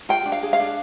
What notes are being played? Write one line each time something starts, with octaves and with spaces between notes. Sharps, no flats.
F4 G5
D4
F5
G#4
F5
D4